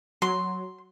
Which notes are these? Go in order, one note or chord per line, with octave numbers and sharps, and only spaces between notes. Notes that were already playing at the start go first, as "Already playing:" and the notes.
F#3 C6